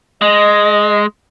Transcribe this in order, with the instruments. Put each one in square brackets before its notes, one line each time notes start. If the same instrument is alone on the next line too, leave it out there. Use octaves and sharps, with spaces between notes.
[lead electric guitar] G#3 [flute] D#5